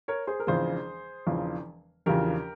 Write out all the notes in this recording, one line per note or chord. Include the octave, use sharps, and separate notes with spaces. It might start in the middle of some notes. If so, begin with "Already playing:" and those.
A#4 C#5
G#4 C5
A#4
E1 E2 C#3 F3 G#4 C5
E1 E2 C#3 F3
E1 E2 C#3 F3 G4 A#4